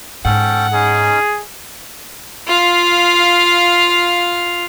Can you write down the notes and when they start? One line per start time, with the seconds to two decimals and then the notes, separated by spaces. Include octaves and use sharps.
0.25 G#2 C#4 A4 F#5 G5
0.73 C#4 D#4 G#4
2.47 F4 F5